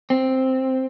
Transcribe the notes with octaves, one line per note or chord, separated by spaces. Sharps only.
C4